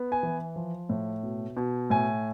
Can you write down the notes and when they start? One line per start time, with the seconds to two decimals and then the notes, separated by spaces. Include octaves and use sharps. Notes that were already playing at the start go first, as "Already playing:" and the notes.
Already playing: B3
0.12 G#5
0.23 E3
0.56 F3
0.89 A2
1.23 B2
1.57 B2
1.90 A2 G#5